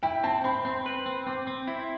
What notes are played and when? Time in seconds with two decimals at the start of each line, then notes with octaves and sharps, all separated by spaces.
0.03 E4 G5
0.24 C4 A5
0.44 C4 B5
0.65 C4 C6
0.86 B4
1.06 C4
1.27 C4 D6
1.47 C4
1.68 E4